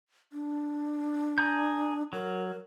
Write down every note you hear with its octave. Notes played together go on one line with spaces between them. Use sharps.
D4
G#4 A#5 G6
F#3 A#4